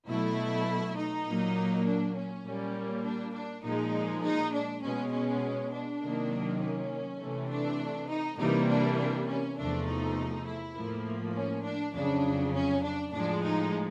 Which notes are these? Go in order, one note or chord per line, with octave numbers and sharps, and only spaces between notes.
B2 F#3 A3 E4
D#4
A#2 F#3 A#3
D4
C#4
A#2 G3 A#3
D4
D4
A#2 F3 G#3 D#4
D#4
D4
B2 G#3 C#4
C#4
D4
C3 D#3 F#3 A#3
C#4
C3 E3 A3
D4
D#4
C3 E3 G3 A#3 D#4
D4
D4
C#4
E2 C3 F3 A3 D4
D#4
E4
A2 F3 A#3
C#4
D4
F2 C#3 F#3 D4
C#4
D4
A2 F3 G#3 D4
D#4